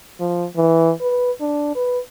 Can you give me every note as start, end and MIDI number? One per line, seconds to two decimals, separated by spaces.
0.20 0.46 53
0.57 0.92 52
1.01 1.31 71
1.41 1.71 62
1.75 1.99 71